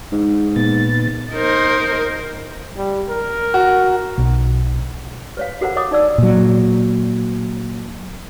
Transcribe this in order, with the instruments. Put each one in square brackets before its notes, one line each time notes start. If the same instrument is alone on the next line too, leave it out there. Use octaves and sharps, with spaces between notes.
[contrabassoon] G#2
[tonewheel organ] A#2 B3 A6
[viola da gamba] D#4 A#4 C5
[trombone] G3
A#4
[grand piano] F#4
[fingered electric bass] B1
[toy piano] B4 C#5 F5
F#4 A4 A#4 C5 F#5 A#5
C#5 D#5 A#5 D6 D#6
D#4 D5 E6
[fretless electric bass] A#2 F#3